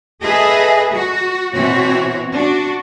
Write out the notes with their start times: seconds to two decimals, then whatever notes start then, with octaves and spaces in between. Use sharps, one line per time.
0.22 G#4 A4 B4 D#5 E5
0.94 F#4
1.55 B2 E3 C4 F#4 C#5
2.35 D4 F#4